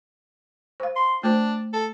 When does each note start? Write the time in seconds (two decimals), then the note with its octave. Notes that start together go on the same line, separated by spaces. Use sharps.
0.80 C5 F5
0.96 C6
1.23 A3 D4 C5
1.73 A4